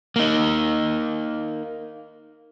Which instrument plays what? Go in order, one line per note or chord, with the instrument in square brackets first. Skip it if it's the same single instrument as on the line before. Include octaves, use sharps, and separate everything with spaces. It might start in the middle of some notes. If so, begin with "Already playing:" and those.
[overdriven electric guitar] A#3 D#4